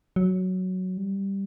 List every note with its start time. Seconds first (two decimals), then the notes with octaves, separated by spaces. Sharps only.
0.16 F#3
0.97 G3